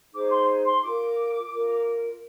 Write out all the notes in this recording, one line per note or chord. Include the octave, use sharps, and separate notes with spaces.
D#4 G#4 C5 D6
C6
C6
F4 A#4 D6
F4 A#4